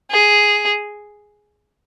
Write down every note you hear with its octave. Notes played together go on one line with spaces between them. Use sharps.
G#4